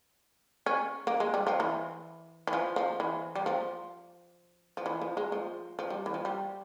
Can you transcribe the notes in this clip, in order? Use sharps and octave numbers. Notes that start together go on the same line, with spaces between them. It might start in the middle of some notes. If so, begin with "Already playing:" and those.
C#4
A#3
G#3
G3
F3
E3
E3
F3
F3
E3
G3
F3
F3
E3
F3
G#3
F3
F3
G3
E3
F3
G3